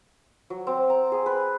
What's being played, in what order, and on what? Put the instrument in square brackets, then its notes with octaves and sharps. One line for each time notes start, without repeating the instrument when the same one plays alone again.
[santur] F#3
C4
A#5
G#4
B4